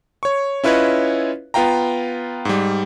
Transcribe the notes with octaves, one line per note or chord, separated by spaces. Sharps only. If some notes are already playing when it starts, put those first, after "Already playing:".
C#5 C#6
C#4 E4 F4 B4 C#5 D#5
B3 F4 F5 G5 A#5
G#2 G3